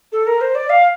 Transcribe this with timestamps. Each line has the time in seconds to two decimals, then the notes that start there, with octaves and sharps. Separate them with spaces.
0.12 A4
0.27 A#4
0.41 C5
0.55 D5
0.70 F5